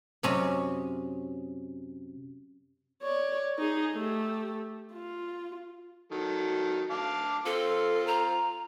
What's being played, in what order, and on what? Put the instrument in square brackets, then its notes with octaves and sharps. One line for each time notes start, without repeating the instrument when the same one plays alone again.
[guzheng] F#2 C3 C#4 D#5
[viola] C#5 D5
D#4 G#4
A3 G4
F4
[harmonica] D#3 F#3 A4
F5 A5 D6
[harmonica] C4 F4 [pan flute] A4
[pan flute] A#5